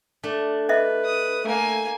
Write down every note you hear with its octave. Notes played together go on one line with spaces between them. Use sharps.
A3 D4
B4 D#5 E5
D#6
A3 A#3 G#5